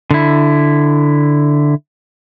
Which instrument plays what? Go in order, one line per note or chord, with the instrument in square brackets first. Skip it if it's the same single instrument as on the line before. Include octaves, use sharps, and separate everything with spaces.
[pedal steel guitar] D3 E4